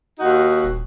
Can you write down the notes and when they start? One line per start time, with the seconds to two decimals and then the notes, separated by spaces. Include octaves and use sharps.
0.19 D#2 D#4 F#4
0.63 D#1